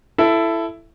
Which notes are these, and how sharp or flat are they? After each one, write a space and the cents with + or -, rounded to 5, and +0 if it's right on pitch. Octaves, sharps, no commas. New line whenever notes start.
E4 +15 A4 +0